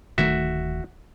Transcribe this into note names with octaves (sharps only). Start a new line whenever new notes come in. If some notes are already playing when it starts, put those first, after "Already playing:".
D1 D#3 A3 F#4 E5